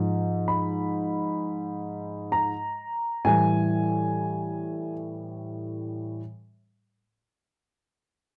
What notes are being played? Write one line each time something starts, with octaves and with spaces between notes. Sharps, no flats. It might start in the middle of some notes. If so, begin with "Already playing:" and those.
Already playing: G#2 F3
B5
A#5
A2 E3 G3 G#5